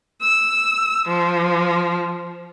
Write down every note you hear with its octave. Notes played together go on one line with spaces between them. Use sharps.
E6
F3